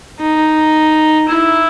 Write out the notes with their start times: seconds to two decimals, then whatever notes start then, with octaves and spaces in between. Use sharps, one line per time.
0.20 D#4
1.29 E4